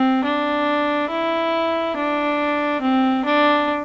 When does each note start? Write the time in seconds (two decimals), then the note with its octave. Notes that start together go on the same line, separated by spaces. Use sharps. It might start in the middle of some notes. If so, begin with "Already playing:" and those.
Already playing: C4
0.24 D4
1.10 E4
1.96 D4
2.81 C4
3.25 D4